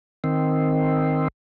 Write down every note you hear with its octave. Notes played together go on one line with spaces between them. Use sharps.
D#3 C4